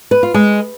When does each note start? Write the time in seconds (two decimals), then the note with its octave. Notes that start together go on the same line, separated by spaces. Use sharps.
0.11 B4
0.23 F4
0.34 G#3